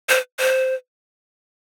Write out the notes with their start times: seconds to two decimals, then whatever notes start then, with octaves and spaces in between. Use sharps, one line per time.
0.09 C5
0.39 C5